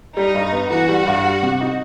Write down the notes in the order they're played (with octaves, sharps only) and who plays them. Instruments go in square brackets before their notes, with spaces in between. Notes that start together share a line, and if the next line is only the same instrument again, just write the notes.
[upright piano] G3 [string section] D#4
[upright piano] G2
B3
[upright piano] E3 [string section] F#4
[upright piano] G3
G2
G3
C3
D#4